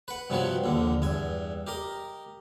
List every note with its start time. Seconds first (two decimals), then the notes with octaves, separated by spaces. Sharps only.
0.08 B4 F#5
0.30 G2 C3 F3 B3 F#4 C#5
0.64 A#1 D#2 D3
1.02 E2 G2 G#5
1.67 G4 A#4 D#5